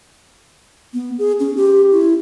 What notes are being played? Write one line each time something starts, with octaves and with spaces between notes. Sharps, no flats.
B3
G#4
C#4
G4
E4